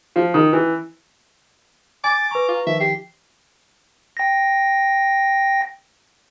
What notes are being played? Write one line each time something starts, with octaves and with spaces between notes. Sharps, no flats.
F3
D#3
E3
G#5 D6 A6
B4 A#5 C#6
F4
D#3 F3 E5
G4 C7
G5 A#6